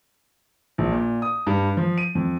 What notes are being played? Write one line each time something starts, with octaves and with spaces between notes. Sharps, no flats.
A#1
A#2
D#6
G2
F3
D#7
F2